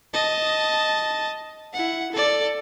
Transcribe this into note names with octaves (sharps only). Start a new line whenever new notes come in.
D#5 A5
E4 F#5
A4 D5